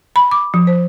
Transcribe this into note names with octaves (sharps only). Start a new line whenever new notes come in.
B5
D6
F3
C5